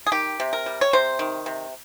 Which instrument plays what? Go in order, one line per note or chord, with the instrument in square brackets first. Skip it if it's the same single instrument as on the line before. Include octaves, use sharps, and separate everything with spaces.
[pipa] G#4
D#3 G4
C3
A#4
G3
C#5
C3 C5
D#3
C3